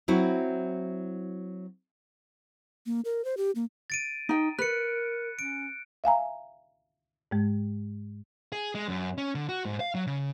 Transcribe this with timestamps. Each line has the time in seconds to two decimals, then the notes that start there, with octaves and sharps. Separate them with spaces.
0.08 F#3 C4 E4 F#4
2.86 A#3
3.05 A#4
3.25 C5
3.37 G4
3.55 A#3
3.90 A6 D7 D#7
4.29 D#4 G5
4.59 A#4 B4 F#6 C#7
5.39 C#4 D7
6.04 E5 F5 G#5 A#5
7.31 G#2 G#3
8.52 G#4
8.75 G#3
8.88 F#2
9.18 C#4
9.35 D3
9.49 F#4
9.65 G#2
9.80 F5
9.95 F#3
10.07 C#3